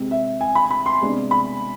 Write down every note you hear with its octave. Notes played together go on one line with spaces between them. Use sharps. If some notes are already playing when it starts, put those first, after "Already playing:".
Already playing: C3 G#3 C4
E5
G#5
B5
B5
C6
C3 G#3 B3 D4
B5